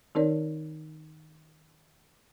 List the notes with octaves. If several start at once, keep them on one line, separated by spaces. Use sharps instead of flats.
D#3 C4 D#4 A#4 C#5 D5